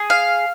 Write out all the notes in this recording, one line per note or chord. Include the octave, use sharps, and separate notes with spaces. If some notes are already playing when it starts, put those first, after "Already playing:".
Already playing: G#4
F5